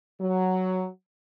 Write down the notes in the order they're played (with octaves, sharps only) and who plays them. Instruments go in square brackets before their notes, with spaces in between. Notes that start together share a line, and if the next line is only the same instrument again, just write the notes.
[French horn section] F#3